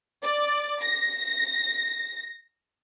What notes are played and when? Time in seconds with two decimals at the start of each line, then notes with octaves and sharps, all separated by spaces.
0.23 D5
0.83 A#6